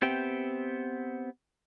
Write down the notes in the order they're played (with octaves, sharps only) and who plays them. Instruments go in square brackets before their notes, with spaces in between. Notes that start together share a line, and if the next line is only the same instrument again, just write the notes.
[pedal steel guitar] B3 C4 G4 E5 G5